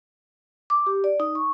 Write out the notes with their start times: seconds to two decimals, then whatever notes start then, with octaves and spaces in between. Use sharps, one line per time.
0.70 D6
0.87 G4
1.04 D5
1.20 D#4
1.35 C#6